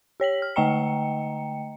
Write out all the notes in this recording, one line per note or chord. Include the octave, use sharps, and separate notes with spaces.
G4 C#5 B6 F#7
F6
D3 A3 D#5 G5 A#5 C#7